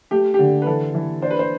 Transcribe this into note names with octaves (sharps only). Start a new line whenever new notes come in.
A3 G4
G4
D3
B4
E3 A4
E3
D4 C5
B4
C5